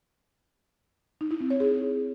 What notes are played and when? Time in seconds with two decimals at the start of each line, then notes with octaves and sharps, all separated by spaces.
1.21 D#4
1.31 E4
1.41 C4
1.50 C#5
1.60 G#4